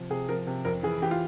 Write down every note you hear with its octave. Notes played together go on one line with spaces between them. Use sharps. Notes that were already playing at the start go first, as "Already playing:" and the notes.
Already playing: C3 F3
C3 G#4
F3 A#4
C3
F2 A#4
E3 G#4
E3 G4
F4